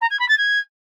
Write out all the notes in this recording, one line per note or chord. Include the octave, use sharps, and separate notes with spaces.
A#5
G#6
B5
A6
G#6